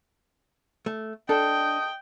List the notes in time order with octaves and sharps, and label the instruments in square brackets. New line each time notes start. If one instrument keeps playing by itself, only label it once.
[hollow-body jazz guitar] A3
[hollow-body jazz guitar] D4 [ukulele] A4 [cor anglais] D#5 [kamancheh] G5